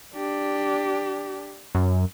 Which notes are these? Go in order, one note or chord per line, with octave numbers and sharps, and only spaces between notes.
D4 G4
F#2